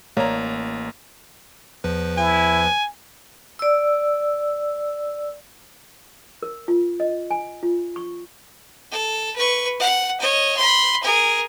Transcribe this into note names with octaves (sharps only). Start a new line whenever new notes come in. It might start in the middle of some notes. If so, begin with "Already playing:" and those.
A1 A#3 C#5 D5 A#5
E2 F3 B4
E4 G#5
D5 E6
A#4
F4
D#5
G#5
F4
C#6
A4
B4 C#6
F#5
C#5 D#5
B5 C6
G#4 A#4